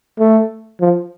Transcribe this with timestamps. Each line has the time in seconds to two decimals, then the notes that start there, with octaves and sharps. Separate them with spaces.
0.19 A3
0.81 F3